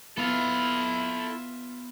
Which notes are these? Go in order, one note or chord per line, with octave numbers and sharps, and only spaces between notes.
B3 E4 F4 A4 E5 F5